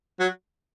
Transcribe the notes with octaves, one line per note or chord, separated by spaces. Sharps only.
F#3